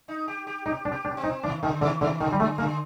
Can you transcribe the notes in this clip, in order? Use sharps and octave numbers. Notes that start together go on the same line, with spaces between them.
D#4
G4
G4
D#4 G4
D4
G4
D4
C4
D#4
D#3 D4
D3 D#3
D3 D#3
D3 D#3
D3 D#3
G3
D3 A3
D3 A#3